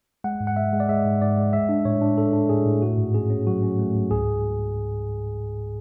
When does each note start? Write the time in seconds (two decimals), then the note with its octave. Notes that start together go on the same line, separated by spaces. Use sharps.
0.24 G#3 F#5
0.41 G#2
0.47 F#5
0.56 G#3 E5
0.73 G#3
0.80 D5
0.89 G#3 E5
1.05 G#2
1.21 G#2 D5
1.38 G#3
1.53 G#3 E5
1.69 D4
1.85 A2 C#5
2.01 D4
2.18 D4 A4
2.33 D4
2.49 A2 G#4
2.66 A2
2.82 A3 F#4
2.98 G#2
3.14 C#4 G#4
3.30 C#4
3.46 F#3 F#4
3.63 C#4
3.79 A3
3.95 G#2
4.11 C#2 G#4